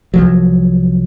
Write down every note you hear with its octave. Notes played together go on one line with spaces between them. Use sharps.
C2 F3 F#3